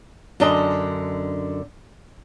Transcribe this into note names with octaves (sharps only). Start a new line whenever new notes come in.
F#2 D3 D4 D#5